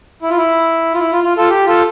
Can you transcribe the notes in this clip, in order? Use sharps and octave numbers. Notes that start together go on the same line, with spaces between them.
E4
F4
E4
F4
E4
F4
F4
F4 A4
G4
F4 A4